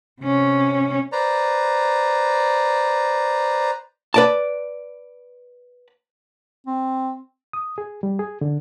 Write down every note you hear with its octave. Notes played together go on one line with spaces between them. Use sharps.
C3 C#4
B4 C5 D5 A#5
B4 D5 A5
C4
D#6
G#4
G3
G#4
D3